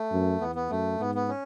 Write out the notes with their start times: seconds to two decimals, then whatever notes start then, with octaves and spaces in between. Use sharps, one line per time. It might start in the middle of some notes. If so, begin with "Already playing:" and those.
Already playing: A3
0.12 F#2
0.41 E2 B3
0.55 B3
0.70 F#2 A3
1.00 G#2 B3
1.15 B3
1.29 C#4